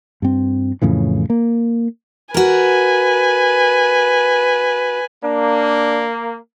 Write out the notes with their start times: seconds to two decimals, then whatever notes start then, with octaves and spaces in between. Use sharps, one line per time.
0.22 G2 C4
0.82 F2 A2 C#3 E3
1.30 A#3
2.34 F#4 A#4 B4 G#5
5.23 A#3 D4